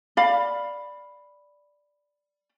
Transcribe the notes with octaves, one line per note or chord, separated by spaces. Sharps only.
D5 F5 B5